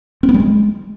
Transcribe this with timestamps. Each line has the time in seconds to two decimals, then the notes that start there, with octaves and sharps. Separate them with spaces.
0.23 C4
0.29 B3
0.34 G3
0.40 G#3